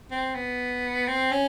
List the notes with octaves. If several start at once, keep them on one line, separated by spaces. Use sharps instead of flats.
C4
B3
C4
C#4